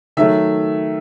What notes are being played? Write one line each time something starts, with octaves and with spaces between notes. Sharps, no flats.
D#3 F#3 A3 E5